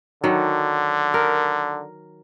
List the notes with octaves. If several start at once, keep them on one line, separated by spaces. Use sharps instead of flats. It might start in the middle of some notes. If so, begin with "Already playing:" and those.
D3 D#3 F#3
A#4